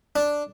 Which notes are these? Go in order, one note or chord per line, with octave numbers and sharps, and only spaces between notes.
D4